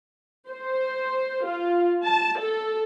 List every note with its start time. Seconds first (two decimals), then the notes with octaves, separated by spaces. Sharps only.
0.49 C5
1.46 F4
2.06 A5
2.40 A4